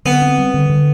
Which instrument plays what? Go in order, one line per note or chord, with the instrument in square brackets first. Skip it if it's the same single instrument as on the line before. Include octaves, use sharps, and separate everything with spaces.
[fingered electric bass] D3 [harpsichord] B3
[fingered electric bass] C4
G3
D3
D3